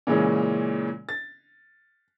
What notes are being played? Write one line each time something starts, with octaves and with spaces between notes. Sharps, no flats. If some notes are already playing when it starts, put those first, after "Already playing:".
A#2 C#3 E3 G#3 C#4
A6